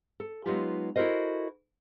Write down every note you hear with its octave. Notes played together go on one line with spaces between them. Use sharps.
A4
F#3 G#3 B3 D#4 F4 G4
E4 F#4 A4 A#4 C5 D#5